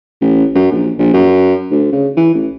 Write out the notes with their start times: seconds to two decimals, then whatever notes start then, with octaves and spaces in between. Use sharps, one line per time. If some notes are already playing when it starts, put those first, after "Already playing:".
0.21 A1
0.55 F#2
0.72 A#1
0.99 A#1
1.14 F#2
1.71 D2
1.93 C#3
2.17 E3
2.35 A1